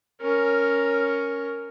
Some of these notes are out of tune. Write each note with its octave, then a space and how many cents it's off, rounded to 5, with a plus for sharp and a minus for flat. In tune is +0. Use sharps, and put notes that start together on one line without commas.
C#4 +0 A#4 +0